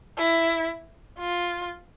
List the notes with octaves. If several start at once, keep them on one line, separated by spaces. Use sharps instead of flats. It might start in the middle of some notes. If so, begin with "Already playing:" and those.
E4
F4